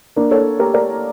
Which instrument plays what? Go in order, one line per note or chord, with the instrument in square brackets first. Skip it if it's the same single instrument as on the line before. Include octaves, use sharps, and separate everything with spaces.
[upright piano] A#3 D4
A4 C#5
G4 A#4
A#4 D5